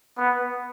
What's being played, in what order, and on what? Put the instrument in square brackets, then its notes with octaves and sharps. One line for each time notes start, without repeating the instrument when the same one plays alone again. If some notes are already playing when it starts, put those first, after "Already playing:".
[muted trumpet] B3